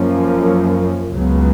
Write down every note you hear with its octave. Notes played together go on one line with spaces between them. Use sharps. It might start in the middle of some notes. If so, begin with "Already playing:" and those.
Already playing: F#2 F3 A#3 C#4
C#2 C#3 F#3 B3